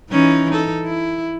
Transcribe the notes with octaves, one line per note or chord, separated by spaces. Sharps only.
E3 C#4 D#4
D#4 A4
E4